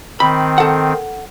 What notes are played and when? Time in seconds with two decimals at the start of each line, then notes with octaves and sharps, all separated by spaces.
0.20 D#3 C4 B5
0.58 A4 F#5